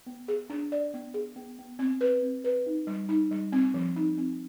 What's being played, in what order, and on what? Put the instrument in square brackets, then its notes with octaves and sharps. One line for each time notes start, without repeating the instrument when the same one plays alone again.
[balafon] B3
G#4
D4
D5
B3
G#4
B3
B3
C4
B4
C4
B4
D#4
G3
D#4
G3
C4
F3
D#4
C4